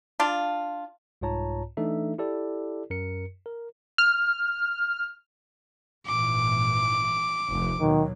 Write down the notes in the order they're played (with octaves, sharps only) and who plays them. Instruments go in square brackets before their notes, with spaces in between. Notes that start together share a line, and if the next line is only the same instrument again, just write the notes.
[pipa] D4 F4
[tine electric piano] C2 G#2 F4 C#5 A5 A#5
E3 A3 D4 D#4 A4 E5
E4 G4 A4 D5
F#2 A#4 C#7
A#4
[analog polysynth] F6
[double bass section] G#1 A#2 E3 [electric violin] D6
[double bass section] F1 D2
[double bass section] D#2 B2 F#3 [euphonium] D#3